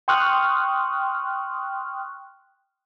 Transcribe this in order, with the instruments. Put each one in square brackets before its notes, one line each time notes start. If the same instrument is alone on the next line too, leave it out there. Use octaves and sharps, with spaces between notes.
[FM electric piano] G5 C6 C#6 D#6 F6 F#6